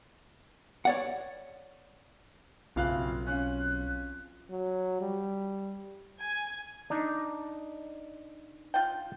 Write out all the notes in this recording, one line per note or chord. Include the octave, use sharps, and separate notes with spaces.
C#5 D5 F#5
F#1 B1 C4 F4 F5 F#6
C#4 F5 F#6
F#3
G3
G#5
D4 D#4
F4 G5